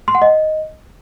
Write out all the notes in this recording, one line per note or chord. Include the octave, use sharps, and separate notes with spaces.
C6
F#5
D#5